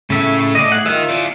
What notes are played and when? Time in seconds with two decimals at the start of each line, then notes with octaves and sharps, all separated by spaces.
0.10 A2 C#3 A3 E5
0.55 D5 D#5
0.72 G#4 F#5
0.86 F4 A#4 D#5 E5
1.09 E4 D5